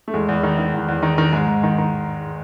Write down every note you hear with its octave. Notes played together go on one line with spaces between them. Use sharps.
A3
E2 G#3
E2
D#3
D#3
E2
E2
D#3
D#3
G#2 G#3
G#2
D#3
D#3